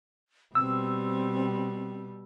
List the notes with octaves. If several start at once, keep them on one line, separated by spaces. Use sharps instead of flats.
B2 G3 C4 E6